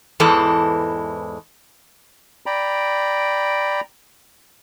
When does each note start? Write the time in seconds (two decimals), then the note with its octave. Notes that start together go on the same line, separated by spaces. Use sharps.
0.20 E2 G#2 E3 G#3 A4
2.46 D5 G5 A#5 B5